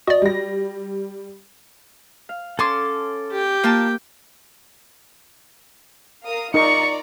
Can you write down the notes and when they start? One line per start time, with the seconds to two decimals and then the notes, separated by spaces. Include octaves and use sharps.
0.07 F#4 D5 D#5
0.22 G3 A#6
2.29 F5
2.59 C#4 A4 A5 C6 D6
3.31 G4 G5
3.64 A#3 F4 A#4 A5
6.24 A#4 F5 D#6
6.54 D#4 F4 A#4 D5 A#5 C#6 C#7